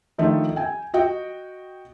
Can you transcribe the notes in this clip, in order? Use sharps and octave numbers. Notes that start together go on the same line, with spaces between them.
D3 D#3 F3 A3
G5 G#5
F#4 D#5 G5